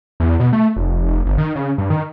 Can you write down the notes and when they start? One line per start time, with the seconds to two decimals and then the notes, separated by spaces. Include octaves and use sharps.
0.20 E2
0.40 B2
0.53 A3
0.76 F1
1.07 F1
1.26 G1
1.38 D#3
1.55 C#3
1.78 G2
1.90 D#3